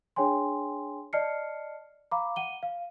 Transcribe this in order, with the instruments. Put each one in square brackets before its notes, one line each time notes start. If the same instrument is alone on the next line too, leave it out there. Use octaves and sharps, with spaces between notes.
[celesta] D4 G#4 C#5 G5 G#5 C6
D5 D#5 A5 F6 C7 C#7
F5 A#5 B5 D6
F#5 D#7 G7
F5